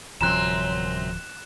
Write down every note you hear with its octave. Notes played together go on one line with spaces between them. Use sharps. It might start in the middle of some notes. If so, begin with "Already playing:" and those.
D1 C2 F#2 F3 C4 A#5 F#6 E7